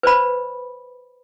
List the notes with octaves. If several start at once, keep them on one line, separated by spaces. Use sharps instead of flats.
B4 C5 D5 B5